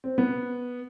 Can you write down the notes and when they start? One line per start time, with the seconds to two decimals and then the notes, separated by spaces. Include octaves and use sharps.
0.04 C4
0.18 B3